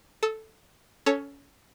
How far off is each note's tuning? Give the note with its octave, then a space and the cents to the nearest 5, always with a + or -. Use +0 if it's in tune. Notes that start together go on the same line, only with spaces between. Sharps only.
A4 +0 E6 -45
C#4 +20 A4 +0 C#5 +0